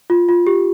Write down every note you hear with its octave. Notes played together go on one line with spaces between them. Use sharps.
F4
F4
G4